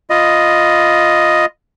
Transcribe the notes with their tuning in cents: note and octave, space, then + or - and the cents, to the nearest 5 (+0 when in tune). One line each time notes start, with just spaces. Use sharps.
F4 +0 D#5 +0 B5 +0